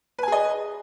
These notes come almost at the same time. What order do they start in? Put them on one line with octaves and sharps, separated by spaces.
B4 G#5 G#4 D#5